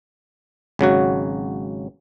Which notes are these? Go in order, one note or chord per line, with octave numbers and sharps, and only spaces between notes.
G#1 C#3 F#3 F#4